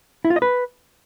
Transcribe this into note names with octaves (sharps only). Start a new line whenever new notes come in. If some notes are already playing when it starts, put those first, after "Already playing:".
E4
F4
D#5
B4